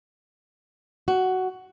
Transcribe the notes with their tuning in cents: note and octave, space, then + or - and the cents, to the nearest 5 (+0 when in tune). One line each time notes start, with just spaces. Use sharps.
F#4 +10